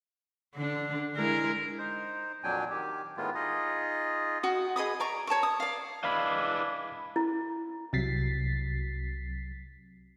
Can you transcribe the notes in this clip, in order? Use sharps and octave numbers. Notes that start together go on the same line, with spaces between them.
D3 D4
G#3 E4 A#4
D#4 C5
F2 A#2 F#3 D4 G5 G#5
D#3 G4
A2 D#3 G#3 B3 F4
D#4 F4 G#4 D#5
F#4 D#5 D#6
G#4 D#5 B5 D#6
D5 A#5 C#6
C#5 A5 A#5 C#6
D#6
D5 F5
E3 G#3 D4 F5 B5
E4
C2 C3 F#3 A6 B6 C7